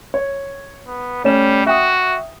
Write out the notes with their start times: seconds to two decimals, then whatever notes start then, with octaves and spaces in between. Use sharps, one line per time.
0.14 C#5
0.86 B3
1.24 G3 A3 C#4 E7
1.66 F#4 E5 G5 D#6